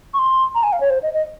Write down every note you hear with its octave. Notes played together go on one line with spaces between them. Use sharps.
C#6
C6
A#5
G#5
F5
C#5
C5
D#5
D#5